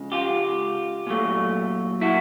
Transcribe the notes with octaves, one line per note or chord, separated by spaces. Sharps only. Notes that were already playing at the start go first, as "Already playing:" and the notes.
Already playing: C#2 C#3 F3 G#3
F4 G4
A#2 F#3 A3
E4 F#4